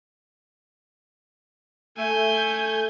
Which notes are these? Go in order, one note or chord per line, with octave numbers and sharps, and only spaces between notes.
A3 G#5 G6